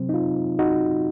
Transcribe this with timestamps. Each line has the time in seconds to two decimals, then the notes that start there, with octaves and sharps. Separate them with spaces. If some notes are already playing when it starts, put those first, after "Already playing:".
Already playing: C3 F#3 C4
0.09 D#4
0.14 F4
0.59 D#4 F#4